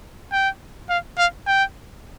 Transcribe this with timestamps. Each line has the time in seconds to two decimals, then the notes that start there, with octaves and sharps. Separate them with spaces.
0.32 G5
0.89 F5
1.18 F5
1.47 G5